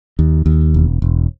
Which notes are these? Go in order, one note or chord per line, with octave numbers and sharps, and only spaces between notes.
D#2
D#2
E1
E1